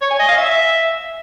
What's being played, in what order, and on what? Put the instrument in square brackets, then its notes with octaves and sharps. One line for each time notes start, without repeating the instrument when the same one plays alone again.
[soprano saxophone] C#5
G#5
D#5
F5
E5